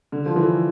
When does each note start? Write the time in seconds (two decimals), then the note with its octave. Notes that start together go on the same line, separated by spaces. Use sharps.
0.12 D3
0.26 F3
0.36 E3